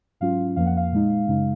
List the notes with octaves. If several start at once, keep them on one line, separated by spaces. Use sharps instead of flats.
G#2 F#3 C#4 F4 F5
F2 F3 A#3 F5
F#5
F5
A#2 G#3 D#4
F#2 C#3 G#3 D#4